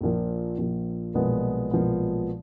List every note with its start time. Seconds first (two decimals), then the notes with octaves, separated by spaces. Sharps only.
0.01 A#1 A#2 F3
0.58 A#1 A#2 F3
1.14 B1 A#2 F3 G#3 B3
1.71 B1 A#2 F3 G#3 B3